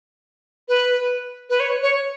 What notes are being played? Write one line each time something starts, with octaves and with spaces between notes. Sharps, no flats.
B4
B4
C#5
C#5